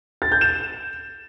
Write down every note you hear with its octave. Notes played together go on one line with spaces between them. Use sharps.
A6
G6
E7